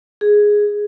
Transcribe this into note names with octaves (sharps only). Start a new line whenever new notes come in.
G#4